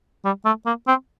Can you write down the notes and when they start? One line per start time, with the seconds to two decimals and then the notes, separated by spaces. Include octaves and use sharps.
0.24 G3
0.45 A3
0.66 A#3
0.87 C4